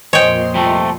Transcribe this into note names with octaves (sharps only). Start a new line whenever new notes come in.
F2 A#2 C5 C#5 D#5 G5 G#5 C6
C3 G3 A3